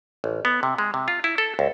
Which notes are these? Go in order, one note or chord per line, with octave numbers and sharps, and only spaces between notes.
A1
B3
C3
G#3
C3
F4
E4
A4
C#2